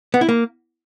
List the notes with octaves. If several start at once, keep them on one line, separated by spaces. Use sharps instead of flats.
B3
E4
A#3